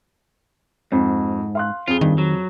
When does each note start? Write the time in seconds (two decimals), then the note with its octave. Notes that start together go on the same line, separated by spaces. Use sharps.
0.92 F2 G#2
1.55 F5 C6 F#6
1.88 F2 F4 G#4 G7
2.01 G2 D#3
2.18 F#3